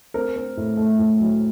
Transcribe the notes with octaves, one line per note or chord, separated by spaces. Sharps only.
C4 A#4
C4
A2
A3
A2
F#3